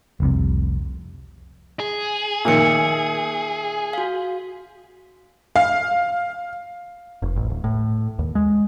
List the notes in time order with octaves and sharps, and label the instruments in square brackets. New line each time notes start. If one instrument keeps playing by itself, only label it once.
[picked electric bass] F1 C2 C3
[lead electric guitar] G#4
[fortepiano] A#2 D#3 [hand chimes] E5 E6 C#7
[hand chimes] F#4 F5
[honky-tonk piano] F5
[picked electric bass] F1
A1
D1
A2
D#2
G#3